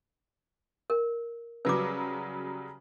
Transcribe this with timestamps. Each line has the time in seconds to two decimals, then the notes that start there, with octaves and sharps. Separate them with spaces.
0.90 A#4
1.65 C#3 F#3 G3 B4 D6